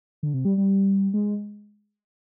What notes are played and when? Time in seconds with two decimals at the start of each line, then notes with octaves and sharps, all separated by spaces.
0.23 D3
0.34 C3
0.45 G3
0.57 G3
1.14 G#3